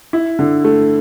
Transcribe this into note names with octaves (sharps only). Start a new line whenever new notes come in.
E4
D3
A3